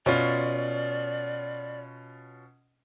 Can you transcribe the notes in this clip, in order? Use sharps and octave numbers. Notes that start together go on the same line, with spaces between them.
B2 C#4 F4 D5